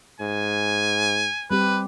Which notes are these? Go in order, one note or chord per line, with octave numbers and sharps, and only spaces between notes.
G#2 G#5
G3 C4 G4 B4